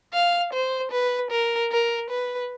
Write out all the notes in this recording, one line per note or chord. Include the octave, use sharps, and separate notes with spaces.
F5
C5
B4
A#4
A#4
B4